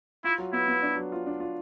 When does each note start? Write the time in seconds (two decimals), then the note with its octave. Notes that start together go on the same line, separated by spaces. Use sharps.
0.24 E4 F4
0.38 F#3
0.53 B3 E4
0.68 B3
0.82 D4
0.96 F#3
1.12 F4
1.27 D4
1.40 F4